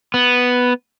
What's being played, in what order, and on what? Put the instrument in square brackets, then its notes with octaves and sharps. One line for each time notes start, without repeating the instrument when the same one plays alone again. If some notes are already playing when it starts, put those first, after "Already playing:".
[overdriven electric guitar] B3